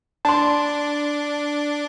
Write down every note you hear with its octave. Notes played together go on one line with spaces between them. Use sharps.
D4 A5 C6